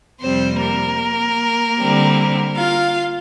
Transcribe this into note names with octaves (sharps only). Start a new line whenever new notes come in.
F2 C3 G3 C4 C5
A#3 A#4
D3 G3 C4
F4 F5